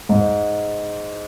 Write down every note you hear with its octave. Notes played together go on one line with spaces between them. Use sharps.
G#2